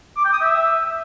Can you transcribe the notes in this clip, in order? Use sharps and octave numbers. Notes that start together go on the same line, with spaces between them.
D6
G5
D#6
E5